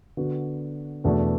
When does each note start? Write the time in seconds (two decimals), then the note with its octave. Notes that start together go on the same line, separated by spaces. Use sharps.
0.17 D3 B3 F#4
1.04 E2 B2 A3 D4 F#4